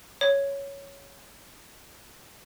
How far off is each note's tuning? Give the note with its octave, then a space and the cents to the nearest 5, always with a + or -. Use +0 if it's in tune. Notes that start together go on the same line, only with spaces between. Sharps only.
C#5 +5